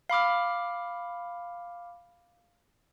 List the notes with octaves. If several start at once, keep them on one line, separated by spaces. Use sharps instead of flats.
F5 B5 D6 F6